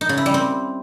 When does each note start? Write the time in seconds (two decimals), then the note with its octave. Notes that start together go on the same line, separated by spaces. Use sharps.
0.01 D#4
0.09 C#3
0.18 E4
0.26 G3
0.34 C4